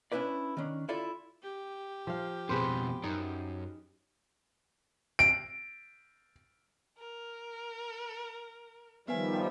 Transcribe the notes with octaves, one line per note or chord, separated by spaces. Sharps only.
C#4 D4 E4 B4 D5
D#3 C#4 D4
E4 F4 A4 D5 E5
G4
F3 F5
F2 B2 G#4 B4 C5
F#2 D#4
D7
A#4
D#3 F3 G3 B3 B4 E5 G#5